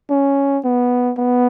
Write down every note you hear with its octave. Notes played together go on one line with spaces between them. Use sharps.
C#4
B3
B3